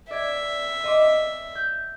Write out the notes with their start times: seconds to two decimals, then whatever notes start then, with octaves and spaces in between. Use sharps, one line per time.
0.11 D5 E5 G#6
0.84 D#5 C6 D6
1.55 G6